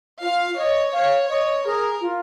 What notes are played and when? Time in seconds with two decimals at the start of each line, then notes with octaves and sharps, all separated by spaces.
0.21 F4 F5
0.57 C#5 D#5
0.93 C#5 F5
1.29 C#5 D#5
1.65 G#4 A#4
2.01 F4